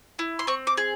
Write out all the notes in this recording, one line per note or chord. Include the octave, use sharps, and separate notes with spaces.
E4
C6
C4 C#6
D6
G#4